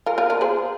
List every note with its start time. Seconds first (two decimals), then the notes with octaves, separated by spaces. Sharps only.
0.06 F4 A#4
0.18 F4 A#4
0.30 F4 A#4
0.41 G#4 C5